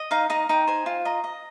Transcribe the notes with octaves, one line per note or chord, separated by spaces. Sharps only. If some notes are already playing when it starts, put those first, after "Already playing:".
Already playing: D#5
D#4 F5
D#4 D#5
D#4 G5
C5 G#5
F4
D#5 A#5
D#5